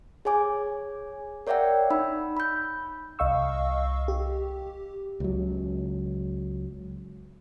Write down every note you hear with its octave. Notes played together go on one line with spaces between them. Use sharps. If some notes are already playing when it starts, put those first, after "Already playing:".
G#4 C#5 G#5 D6
A#4 C#5 D5 E5 F#5 G5
D#4 B5 E6
B5 G6
C2 D#5 F5 C#6 E6
G4
C#2 F#3